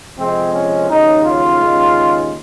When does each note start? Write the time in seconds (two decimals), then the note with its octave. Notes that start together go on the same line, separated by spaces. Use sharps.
0.16 F2 C3 F3 G#3 C4
0.52 C#4
0.88 D#2 C#3 F#3 D#4
1.23 F4
1.59 D#2 C#3 G#3